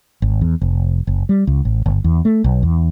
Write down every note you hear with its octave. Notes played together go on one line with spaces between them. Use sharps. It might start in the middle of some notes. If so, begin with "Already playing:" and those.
G#1
E2
F1
F#1
G3
C#2
A1
G1
E2
A3
B1
E2